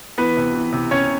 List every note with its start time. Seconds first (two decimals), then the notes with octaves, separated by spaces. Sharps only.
0.18 E3 B3 B4
0.37 C3
0.54 E3
0.73 C3
0.91 C3 C#4 C#5